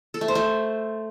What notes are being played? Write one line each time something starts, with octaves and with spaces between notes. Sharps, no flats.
A4
A3
C5
A3